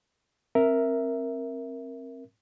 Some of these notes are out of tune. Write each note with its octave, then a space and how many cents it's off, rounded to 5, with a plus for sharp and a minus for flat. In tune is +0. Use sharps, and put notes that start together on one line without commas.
C4 +25 A#4 +0 E5 +0